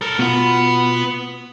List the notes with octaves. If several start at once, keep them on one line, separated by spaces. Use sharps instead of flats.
A4 A#4
B2 B3 F4